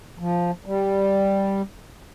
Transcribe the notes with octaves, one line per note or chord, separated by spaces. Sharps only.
F3
G3